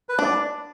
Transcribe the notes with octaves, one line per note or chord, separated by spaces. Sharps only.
B4
D4 D5